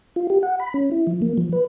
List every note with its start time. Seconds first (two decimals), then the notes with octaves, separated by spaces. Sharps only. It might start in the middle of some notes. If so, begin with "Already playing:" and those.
0.16 F4
0.30 G4
0.43 F#5
0.60 B5
0.74 C#4
0.91 E4
1.07 F3
1.22 A#3
1.37 F3
1.53 B4